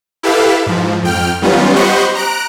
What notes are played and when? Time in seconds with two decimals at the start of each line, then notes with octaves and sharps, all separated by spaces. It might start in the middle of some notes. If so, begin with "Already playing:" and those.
0.23 E4 G4 A4 B4 E5 F5
0.66 G#2 F3
1.03 F2 G5 F6
1.42 D#3 F#3 G3 B3 C#4 F4
1.76 G4 C5 D#5 F#5 B5 C#6
2.15 A#5 F#6 D7